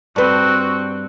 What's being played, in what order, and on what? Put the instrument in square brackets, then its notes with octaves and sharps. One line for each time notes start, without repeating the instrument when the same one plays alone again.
[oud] G2 B4 [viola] C4 F#4